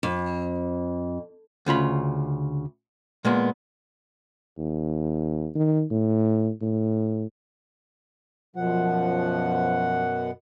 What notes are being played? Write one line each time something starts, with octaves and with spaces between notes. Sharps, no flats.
F2
D2 C#3 F4 B5
A#2 G#3 A#3 B3
D#2
D#3
A2
A2
F#2 B2 F3 F#5